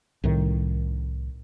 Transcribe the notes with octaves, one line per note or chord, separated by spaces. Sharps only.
C2 A2 D#3